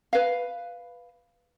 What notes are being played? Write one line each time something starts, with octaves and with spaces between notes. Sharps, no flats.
B4 F5